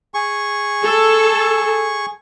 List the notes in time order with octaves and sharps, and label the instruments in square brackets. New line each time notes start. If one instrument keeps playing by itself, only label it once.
[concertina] G#4 C#6
[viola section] A4